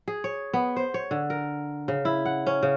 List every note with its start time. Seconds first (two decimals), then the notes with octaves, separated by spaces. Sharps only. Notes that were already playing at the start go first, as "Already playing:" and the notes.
0.08 G#4
0.24 C#5
0.54 B3
0.76 C5
0.94 C#5
1.11 D3
1.30 A#4
1.88 C#3
2.05 E4
2.25 F#5
2.47 C#4
2.63 C#3